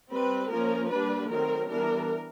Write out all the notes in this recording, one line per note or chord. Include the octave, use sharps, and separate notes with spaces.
G3 C4 B4
F3 A#3 C#4 A#4
G3 A#3 D4 B4
D#3 F#3 A3 C4 A#4
E3 G3 B3 D4 A#4